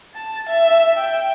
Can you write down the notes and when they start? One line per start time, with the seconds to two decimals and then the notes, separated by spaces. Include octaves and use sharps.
0.15 A5
0.49 E5
0.97 G5